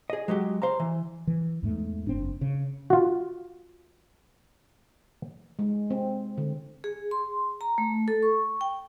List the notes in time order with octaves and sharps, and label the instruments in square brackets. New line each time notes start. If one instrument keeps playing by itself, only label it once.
[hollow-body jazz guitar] G#4 D#5
F#3 G#3 F#4 G4
C5 F5 A#5
E3
[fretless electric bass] E3
E2 G#2 A3
F#1 C4 D4
C#3
[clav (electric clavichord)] F4 F#4
[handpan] G#3
C4
D3
[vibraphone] G#4
C6
A#5
A3
A4
C#6
G5